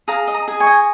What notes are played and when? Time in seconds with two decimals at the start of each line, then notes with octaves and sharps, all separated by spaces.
0.08 G#4 F5 A#5
0.27 D#5
0.34 A#5 D#6
0.48 G#4
0.60 G#5 C#6
0.66 D#5